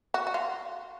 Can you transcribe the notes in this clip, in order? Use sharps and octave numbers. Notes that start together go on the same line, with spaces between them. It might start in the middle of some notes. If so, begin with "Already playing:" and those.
F#4
F#4
F4